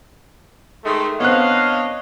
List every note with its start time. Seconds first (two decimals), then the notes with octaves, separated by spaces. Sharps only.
0.84 D#3 G#3 A3
1.20 B3 C4 D4 C#5 D#5 F5 F#6